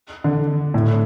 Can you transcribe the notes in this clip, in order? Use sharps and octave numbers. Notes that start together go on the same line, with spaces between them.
D3
A2